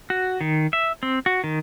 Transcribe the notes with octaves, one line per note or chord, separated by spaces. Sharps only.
F#4
D#3
E5
C4
F#4
D#3